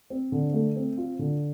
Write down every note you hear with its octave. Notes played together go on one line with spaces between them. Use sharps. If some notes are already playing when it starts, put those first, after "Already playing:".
C4
D3
A3
C4
F4
D3